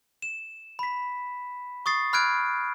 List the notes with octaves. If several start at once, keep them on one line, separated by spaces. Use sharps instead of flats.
E7
B5 B6
C#6 D#6 A6 C7
B5 F6 F#6 G#6 D7